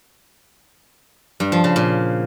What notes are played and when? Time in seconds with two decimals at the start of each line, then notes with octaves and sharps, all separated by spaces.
1.40 G2
1.52 F3
1.64 C#3
1.76 A#2